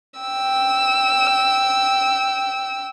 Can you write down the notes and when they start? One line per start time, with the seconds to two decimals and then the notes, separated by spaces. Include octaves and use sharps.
0.20 G5 E6